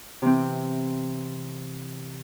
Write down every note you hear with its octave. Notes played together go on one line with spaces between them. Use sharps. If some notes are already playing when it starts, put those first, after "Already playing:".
C3 E3 C4